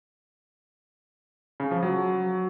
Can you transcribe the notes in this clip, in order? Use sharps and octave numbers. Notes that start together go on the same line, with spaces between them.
C#3
F3
F#3